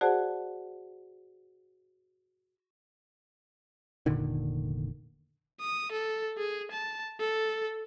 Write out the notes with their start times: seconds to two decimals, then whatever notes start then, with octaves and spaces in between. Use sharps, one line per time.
0.01 F#4 G#4 C5 D5 F#5 A5
4.06 F1 A#2 D3 D#3
5.60 D#6
5.92 A4
6.38 G#4
6.72 A5
7.20 A4